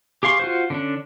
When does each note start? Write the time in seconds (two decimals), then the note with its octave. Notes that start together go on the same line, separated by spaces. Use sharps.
0.23 G4 G#4 F5 C6 C#6
0.39 F4 F#4 C5
0.70 D3 C#4 D4